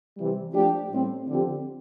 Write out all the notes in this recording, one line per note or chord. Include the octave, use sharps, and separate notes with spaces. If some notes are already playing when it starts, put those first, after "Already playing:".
C3 E3 G3
F3 A3 D4 G4
A2 G3 C4
D3 F3 C4 G4